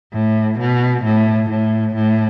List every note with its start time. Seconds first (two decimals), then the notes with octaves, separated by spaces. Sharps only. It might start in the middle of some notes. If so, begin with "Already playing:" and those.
0.13 A2
0.59 B2
1.04 A2
1.50 A2
1.95 A2